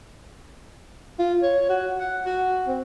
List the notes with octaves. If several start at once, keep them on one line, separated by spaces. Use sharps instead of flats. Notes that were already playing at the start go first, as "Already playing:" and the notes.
F4
C#5
F#4
F#5
F#4
C4